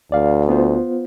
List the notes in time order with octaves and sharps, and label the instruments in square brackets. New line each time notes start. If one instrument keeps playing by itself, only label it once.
[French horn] D2 [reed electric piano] D5 F5
[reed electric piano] B3 F4 C5